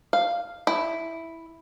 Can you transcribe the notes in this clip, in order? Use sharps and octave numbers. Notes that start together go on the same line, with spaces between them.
F5
E4